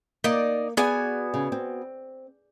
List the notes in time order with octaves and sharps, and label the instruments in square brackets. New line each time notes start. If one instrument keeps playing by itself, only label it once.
[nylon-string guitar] A#3 [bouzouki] D#4 D5
[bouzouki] B3 F#4 G#5 [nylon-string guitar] G#4 D5
[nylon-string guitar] C#3
C4